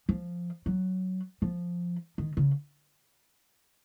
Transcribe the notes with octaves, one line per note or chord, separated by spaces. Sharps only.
F3
F#3
F3
D#3
C#3